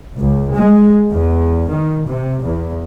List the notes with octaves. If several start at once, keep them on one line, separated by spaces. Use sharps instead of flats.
C#2
G#3
E2
D#3
C3
E2